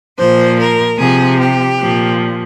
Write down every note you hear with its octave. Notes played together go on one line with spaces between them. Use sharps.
A#2 F3 C5
A#4
C3 F3 G#4
G4
A#2 F3